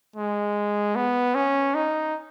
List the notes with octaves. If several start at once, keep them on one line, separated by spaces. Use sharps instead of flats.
G#3
B3
C#4
D#4